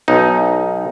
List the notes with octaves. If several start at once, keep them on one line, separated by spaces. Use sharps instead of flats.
B1 D#4